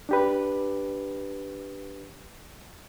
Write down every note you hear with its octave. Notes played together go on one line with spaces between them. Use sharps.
D4 G4 B4